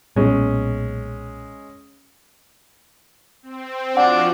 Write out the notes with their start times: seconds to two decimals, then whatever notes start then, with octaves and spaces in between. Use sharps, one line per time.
0.16 B1 A#2 G#3 B3 C#4
3.43 C4
3.97 F3 D4 F4 F#4 F#5